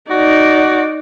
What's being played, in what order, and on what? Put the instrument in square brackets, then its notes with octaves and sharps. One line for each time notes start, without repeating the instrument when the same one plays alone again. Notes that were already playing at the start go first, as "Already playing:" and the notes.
[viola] D#4 D5 [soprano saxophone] F#4